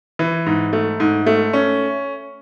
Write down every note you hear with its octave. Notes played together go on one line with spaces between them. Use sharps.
E3
G#2
A3
G#2
A3
C#4